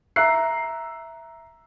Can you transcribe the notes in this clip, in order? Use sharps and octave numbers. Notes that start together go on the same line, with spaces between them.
E5 A#5 E6 F#6 C7